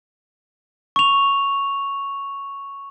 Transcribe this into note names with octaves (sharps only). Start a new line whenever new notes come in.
C#6 F7